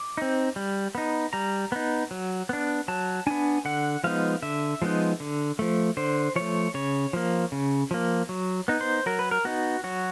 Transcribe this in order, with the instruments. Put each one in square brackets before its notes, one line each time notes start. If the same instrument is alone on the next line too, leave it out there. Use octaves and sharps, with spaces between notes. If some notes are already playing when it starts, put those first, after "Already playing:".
Already playing: [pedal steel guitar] D6
C4 D#4
G3
B3 D#4
G3 A#5
B3 D#4
F#3
B3 D4
F#3 A5
B3 D4 G#5
D3 F#5
F3 G#3 B3 D#4 F5
D3 E5
F3 G#3 B3 D#4
D3
F3 A3
D3 C5
F3 A3 C#5
C#3 C#5
F3 A#3
C#3
F3 A#3
F#3
B3 D#4
C5
F#3 A#4
B4
A#4
B3 D#4 F#4
F#3 F#4